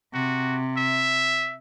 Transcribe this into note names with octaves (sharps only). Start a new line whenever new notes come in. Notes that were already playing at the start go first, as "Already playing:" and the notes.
C3 F#4
E5